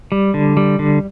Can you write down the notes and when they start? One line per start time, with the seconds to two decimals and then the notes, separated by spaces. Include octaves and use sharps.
0.12 G3
0.34 D3
0.57 G3
0.79 D3